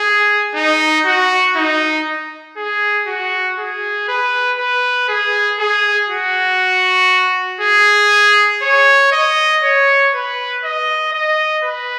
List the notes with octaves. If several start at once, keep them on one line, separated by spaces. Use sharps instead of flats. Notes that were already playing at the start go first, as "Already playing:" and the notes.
Already playing: G#4
D#4
F#4
D#4
G#4
F#4
G#4
B4
B4
G#4
G#4
F#4
G#4
C#5
D#5
C#5
B4
D#5
D#5
B4